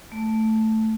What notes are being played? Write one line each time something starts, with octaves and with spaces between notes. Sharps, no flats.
A3